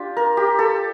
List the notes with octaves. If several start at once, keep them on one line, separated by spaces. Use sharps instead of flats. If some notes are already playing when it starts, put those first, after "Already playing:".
Already playing: D4 F4 G4
A#4
G4
A4